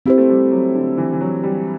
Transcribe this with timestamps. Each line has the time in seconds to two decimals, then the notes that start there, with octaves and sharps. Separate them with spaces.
0.06 C4 E4 G4 C5
0.18 A3
0.29 G3
0.52 F#3
0.75 D3
0.98 E3
1.13 E3
1.21 F#3
1.43 G3